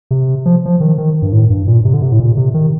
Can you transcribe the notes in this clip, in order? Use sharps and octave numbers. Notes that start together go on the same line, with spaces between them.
C3
F3
F3
D#3
D#3
G2
A2
G2
A#2
C3
D3
C3
A2
A#2
C3
D#3